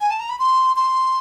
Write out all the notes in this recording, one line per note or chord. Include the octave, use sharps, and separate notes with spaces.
G#5
A5
A#5
B5
C6
C6